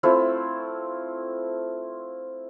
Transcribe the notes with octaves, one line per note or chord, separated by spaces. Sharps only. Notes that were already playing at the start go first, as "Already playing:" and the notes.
A3 C4 E4 F4